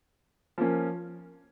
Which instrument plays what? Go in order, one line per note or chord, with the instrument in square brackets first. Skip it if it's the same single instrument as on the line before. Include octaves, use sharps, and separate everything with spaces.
[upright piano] F3 A#3 C#4